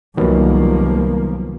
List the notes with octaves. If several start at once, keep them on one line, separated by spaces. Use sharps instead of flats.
C2 D#3 F3 F#3 A#3 B3